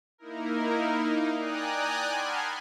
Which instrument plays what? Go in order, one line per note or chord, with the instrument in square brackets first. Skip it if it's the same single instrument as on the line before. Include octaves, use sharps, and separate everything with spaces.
[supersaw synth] A#3 D#4 E4 A#4
D#4 F5
D5 G5 G#5 A#5 D#6 F#6
F#5 G#5 A5 B5 C6 F6